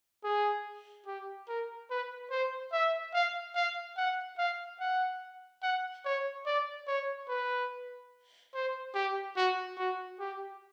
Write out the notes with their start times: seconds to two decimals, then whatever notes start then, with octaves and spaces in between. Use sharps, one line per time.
0.24 G#4
1.07 G4
1.48 A#4
1.90 B4
2.31 C5
2.73 E5
3.14 F5
3.55 F5
3.97 F#5
4.39 F5
4.80 F#5
5.63 F#5
6.05 C#5
6.46 D5
6.87 C#5
7.29 B4
8.54 C5
8.95 G4
9.37 F#4
9.78 F#4
10.20 G4